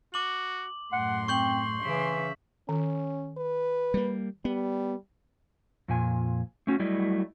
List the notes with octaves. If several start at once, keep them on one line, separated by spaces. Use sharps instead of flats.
F#4 D6 F#7
F#2 A2 F#5 C6
C4 C#6 G6 F#7
C#3 E3 E5
D#3 C#4
B4
G3 A#3
G3 B3
F2 A#2 G#5
A3 C#4 F#4
F#3 G3 A3 E4 D5 D#5